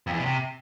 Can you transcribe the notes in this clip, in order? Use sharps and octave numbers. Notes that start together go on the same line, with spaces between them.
F2
E2
B2
C3